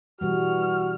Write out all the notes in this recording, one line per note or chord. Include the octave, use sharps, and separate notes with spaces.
B2 E3 G3 F#4 F6